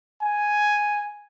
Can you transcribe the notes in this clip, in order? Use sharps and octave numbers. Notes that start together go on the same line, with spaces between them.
G#5